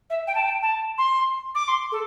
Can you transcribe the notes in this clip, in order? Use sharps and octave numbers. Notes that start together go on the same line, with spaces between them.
E5
G5
A5
G5
A5
C6
D6
C6
A4